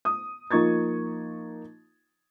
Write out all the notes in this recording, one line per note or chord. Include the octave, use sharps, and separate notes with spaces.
D#6
F3 A#3 D#4 C#6 G#6 A6